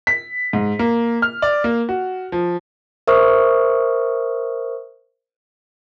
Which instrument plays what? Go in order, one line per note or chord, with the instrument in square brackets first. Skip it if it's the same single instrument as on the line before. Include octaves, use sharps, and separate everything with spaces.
[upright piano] B6
G#2
A#3
F6
D5
A#3
F#4
F3
[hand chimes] A#4 C5 E5 C#6 D#6 F6